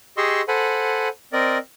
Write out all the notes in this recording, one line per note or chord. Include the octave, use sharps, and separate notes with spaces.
G4 G#4 D#5 C6 C#6 E6
A4 C5 F#5 G#5 B5
C4 A#4 D5 D#5